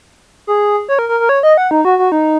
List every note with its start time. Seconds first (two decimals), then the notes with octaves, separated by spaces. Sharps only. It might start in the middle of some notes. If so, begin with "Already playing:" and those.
0.47 G#4
0.89 C#5
0.99 A#4
1.09 A#4
1.20 A#4
1.29 C#5
1.43 D#5
1.57 F#5
1.71 D#4
1.85 F#4
1.99 F#4
2.12 D#4